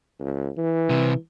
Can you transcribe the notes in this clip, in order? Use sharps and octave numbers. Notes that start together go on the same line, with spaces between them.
C#2
E3
C2 C3